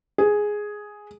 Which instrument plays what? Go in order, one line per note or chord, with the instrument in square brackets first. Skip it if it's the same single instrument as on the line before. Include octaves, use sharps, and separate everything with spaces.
[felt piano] G#4